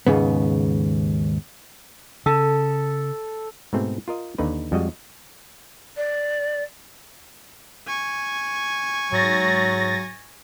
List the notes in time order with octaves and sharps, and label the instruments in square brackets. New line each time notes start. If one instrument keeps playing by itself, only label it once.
[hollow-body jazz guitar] D#2 G#2 C#3 B3
[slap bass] C#3 [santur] A4
[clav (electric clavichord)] G#2 B2 A3 C4
F4 A#4 D#5
D#2 D3 D#4 B4
F2 G3 G#3 F#4 D#5
[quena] D5
[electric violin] G#5 C#6
[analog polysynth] G#2 A6 A#6 [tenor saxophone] F#3